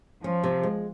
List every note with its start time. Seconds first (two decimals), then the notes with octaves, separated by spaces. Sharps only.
0.24 F3 C#4
0.44 C3
0.63 G#3